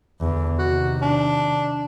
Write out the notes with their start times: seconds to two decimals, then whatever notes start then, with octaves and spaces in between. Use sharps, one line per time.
0.21 E2 D3
0.58 C3 D#3 F#4
1.02 D4